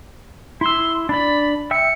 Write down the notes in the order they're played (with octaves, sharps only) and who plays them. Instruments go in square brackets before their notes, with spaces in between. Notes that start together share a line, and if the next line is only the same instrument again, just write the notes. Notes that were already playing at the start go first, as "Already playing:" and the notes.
[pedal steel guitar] E4 E6 [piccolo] C6
[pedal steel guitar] D4 D5 [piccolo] B5
[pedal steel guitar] E5 G5 E6 [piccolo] C#7